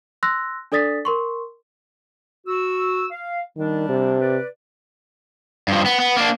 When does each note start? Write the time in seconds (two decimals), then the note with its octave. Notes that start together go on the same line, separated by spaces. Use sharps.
0.23 C6 E6 F#6 A#6
0.72 D4 A4 D5 D#6 A6 B6
1.05 A#4 C6 C#6
2.47 F#4 E6
3.11 F5
3.57 D#3 G3 D4
3.89 C3
4.20 B4 D5
5.68 G2 F3
5.86 B3
6.00 B3
6.17 A#3 D4